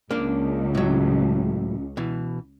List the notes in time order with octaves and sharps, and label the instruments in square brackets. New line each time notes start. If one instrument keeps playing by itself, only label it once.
[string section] C#2 [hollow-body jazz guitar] A#3 D4
[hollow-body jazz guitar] A2 F#3
B2 E3